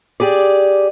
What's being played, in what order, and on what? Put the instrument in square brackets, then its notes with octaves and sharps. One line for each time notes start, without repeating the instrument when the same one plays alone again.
[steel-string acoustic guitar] G4 G#4 D5